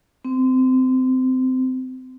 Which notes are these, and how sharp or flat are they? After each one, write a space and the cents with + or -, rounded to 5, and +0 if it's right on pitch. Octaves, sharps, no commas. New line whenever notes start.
C4 -25